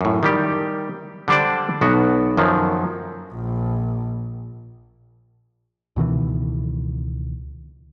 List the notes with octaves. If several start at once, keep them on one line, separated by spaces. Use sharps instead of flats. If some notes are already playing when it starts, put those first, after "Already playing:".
F#2 A2
D#3 G3 G4
D3 G3 D4 C5 D5
B1 B3 F#4
F#2 D#3 F3 F#3
A#1
C#2 B2 D#3 E3